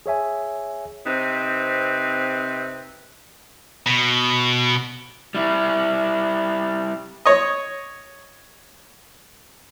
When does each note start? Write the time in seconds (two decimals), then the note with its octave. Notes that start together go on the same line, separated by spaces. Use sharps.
0.06 G#4 C#5 E5 G#5
1.06 C3 C4 D#4 B4
3.86 B2
5.35 G3 E4
7.25 C#5 D#5